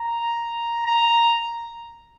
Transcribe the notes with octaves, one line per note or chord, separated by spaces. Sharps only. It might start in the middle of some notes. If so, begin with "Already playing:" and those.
Already playing: A#5
A#5